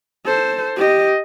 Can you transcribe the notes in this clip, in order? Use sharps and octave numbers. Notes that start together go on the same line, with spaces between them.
A4 C5
G4 D#5